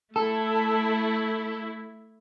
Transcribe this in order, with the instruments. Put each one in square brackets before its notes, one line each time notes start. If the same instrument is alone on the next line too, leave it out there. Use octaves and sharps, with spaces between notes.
[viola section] A3 E4 [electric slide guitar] A4